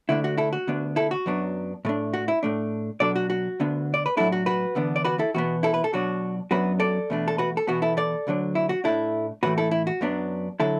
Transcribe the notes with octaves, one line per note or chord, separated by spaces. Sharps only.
D2 D3 A3 D4 E4
F#4
E4 A4
F#4
D2 D3 B3 D4
E4 A4
F#4
F#2 F#3 B3 D4
A2 A3 D4
F#4
E4
A2 A3 D4
B2 F#3 D4 A4 D5
F#4
F#4
D2 D3 B3 D4
D5
B4
A2 F#3 D4 E4 A4
F#4
F#4 B4
E2 D3 B3 D4
D5
F#4 B4
E4 A4
E2 B2 B3 F#4
E4 A4
B4
A4
B2 F#3 D4 F#4
F#2 F#3 B3 D4 F#4 B4
A4 D5
E2 B2 A3 D4
A4
F#4 B4
A4
E2 B2 B3 F#4
E4 A4
A4 D5
D2 D3 F#3 D4
E4
F#4
A2 A3 D4 E4 A4
A2 E3 A3 F#4 B4
E4 A4
E4
F#4
F#2 F#3 B3 D4
D3 F#3 E4 A4